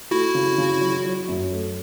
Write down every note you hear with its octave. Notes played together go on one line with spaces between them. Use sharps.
A3 E4 F#4
C#3
C#3
F#3
F#3
F#2
A3